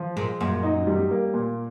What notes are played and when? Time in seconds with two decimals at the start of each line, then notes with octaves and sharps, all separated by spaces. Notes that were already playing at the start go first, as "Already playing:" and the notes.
Already playing: F3
0.16 A#2 G#3
0.41 F#2 A#2
0.63 D#4
0.87 G3
1.11 A#3
1.34 A#2